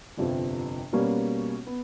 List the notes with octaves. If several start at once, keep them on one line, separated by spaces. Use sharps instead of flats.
G1 F2 C3 F3
B2 G3 A#3 C#4
B3